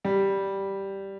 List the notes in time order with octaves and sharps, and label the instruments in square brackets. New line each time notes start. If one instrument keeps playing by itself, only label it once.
[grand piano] G3